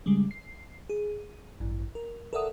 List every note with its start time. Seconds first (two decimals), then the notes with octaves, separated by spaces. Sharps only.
0.06 C#3 G3 G#3
0.31 C7
0.89 G#4
1.60 A1 G2
1.95 A#4
2.33 A4 A#4 D5 E5 F#5 D#6